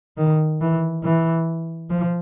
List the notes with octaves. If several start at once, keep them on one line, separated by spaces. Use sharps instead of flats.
D#3
E3
E3
F3